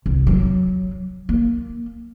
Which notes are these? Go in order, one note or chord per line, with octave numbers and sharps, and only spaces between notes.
C2
F#3
A#3